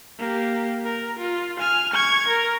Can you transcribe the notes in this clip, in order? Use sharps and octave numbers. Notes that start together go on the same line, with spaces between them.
A#3 G4
A#4
F4
G#5 F6
C#6 G#6
A#4